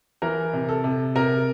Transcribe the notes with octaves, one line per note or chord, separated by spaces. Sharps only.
E3 A#4
C3
A4
C3
C3 A#4